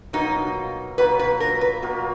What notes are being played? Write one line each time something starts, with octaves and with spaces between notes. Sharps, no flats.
B2 F#3 A#3 D#4 F4
B2 F#3 A#3 F4 B4
B4
A#4
B4
B2 F#3 A#3 F4